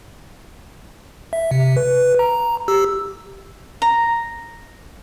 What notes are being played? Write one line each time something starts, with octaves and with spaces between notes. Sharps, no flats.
E5
C3
B4
A#5
G4 E6
A#5